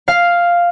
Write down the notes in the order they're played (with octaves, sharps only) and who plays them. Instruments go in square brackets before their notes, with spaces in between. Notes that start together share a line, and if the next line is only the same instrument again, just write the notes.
[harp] F5